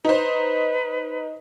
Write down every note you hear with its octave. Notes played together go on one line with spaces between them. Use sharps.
D#4 B4 C5